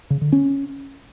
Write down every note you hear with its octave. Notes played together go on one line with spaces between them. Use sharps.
C#3
D3
C#4